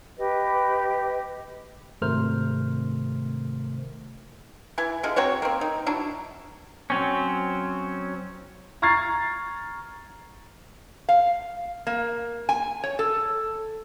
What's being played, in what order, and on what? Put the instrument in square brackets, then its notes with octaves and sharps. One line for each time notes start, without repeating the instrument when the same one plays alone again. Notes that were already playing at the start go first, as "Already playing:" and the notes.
[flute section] G4 B4 D#5
[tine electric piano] G#1 C3 A3 A#4 C5 F6
[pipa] E3 E4 G#5
D3 G#3 F4
F#3 C4 F#4 C#5
A#3 C4
D#4
F#3 D4 E4
[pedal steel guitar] F#3 C4 C#4
[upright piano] A#5 C#6 F6 G#6 A6 C7
[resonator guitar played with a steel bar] F5
A#3
G#5
C#5
A4